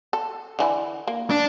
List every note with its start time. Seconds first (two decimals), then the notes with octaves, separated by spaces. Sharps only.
0.13 A4
0.59 D3 E3 E4
1.08 A#3
1.30 D4